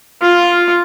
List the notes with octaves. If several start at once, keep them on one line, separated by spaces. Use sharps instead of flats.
F4